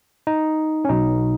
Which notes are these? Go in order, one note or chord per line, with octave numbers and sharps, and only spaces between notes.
D#4
C#4
B1 B2 F#3 D#4